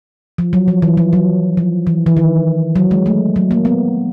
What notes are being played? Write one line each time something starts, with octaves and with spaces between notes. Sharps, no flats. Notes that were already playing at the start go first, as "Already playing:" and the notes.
F3
F#3
F3
E3
F3
F#3
F3
E3
E3
D#3
F#3
G#3
A3
F#3
A#3
B3